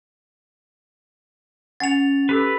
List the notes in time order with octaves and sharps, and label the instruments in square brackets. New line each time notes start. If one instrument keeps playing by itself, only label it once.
[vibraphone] C#4 [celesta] F#5 G#5 C#7 [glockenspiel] A6 F7
[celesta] G4 A4 E6 [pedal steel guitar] B4